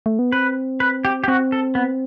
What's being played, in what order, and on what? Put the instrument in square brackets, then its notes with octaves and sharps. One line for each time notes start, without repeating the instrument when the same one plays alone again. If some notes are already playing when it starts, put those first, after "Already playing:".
[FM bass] A3
B3
[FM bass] C4 [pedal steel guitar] B4
[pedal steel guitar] B4
G4
G4
[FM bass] C4 [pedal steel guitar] F#4
[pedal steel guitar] A4
B3